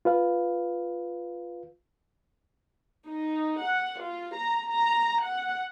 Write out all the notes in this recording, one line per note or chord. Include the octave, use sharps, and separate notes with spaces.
F4 B4 F5
D#4
F#5
F4
A#5
A#5
F#5